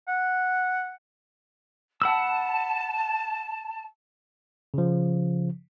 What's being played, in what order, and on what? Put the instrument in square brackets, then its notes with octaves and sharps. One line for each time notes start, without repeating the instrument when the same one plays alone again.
[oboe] F#5
[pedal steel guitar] F#5 B5 E6 [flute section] A5
[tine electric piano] C#3 F3